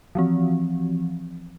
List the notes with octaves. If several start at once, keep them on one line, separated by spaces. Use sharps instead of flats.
E3 F3 C4